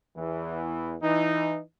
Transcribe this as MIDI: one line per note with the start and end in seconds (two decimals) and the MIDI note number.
0.16 0.96 40
0.16 0.96 52
1.02 1.59 52
1.02 1.59 63